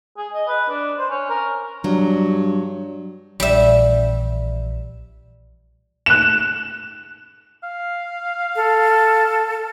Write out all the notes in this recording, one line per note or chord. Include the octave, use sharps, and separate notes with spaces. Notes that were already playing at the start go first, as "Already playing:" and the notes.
G#4
D#5
B4
D4
C5
C#4
A#4
G2 F#3
A#1 E3 G3 E5
F#6 E7
F5
A4